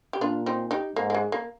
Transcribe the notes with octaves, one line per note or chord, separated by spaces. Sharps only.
G4
A#2 D4 F4
C4 D#4
D#4 G4
G#2 A#3
A#3
G#3
A#3